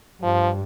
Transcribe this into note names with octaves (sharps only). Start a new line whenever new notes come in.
G2 F3